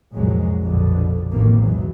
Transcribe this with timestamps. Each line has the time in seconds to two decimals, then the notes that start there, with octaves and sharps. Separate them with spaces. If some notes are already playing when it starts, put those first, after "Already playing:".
0.13 F1 C2 A#2 F3 F#3 G#3
0.61 A#1 F2 B2 D3
1.32 A1 B2 D#3 F3 A#3 C4
1.62 B1 E2 G#2 B2 E3 F#3